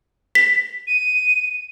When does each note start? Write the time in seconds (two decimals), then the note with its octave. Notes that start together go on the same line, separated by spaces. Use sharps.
0.35 B6
0.87 D#7